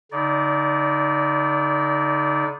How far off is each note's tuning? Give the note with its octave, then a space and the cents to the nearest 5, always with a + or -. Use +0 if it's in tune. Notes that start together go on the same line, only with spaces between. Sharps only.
D3 -40 D#4 +0 D5 -20